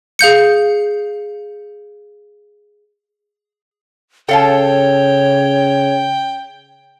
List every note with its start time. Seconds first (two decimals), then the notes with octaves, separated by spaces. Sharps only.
0.19 G#4 F5 G6 C#7
4.29 C#3 A4 C#5 F5 G5 A5